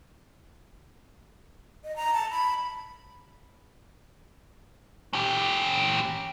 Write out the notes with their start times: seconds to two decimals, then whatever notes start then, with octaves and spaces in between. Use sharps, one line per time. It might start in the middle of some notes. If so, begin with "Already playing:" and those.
1.84 D#5
1.96 A#5
2.14 A5
2.31 B5
5.13 C#4 G4